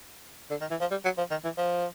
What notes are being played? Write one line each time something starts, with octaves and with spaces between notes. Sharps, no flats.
D3
D#3
E3
F3
G3
F#3
F3
D#3
E3
F3